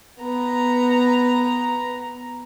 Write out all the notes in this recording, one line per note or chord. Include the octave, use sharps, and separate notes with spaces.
B3 A#5